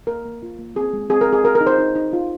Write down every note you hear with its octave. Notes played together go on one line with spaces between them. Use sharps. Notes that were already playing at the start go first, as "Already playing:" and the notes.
A#3 A#4
A#3
F4
A#3
C4 G#4
G#3
C4 G#4
A#4
C4
G#4
F#4 A#4
A#4
D#4
C5
D#4
D#4
F4